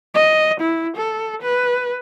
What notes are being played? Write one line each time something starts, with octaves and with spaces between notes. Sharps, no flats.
D#5
E4
A4
B4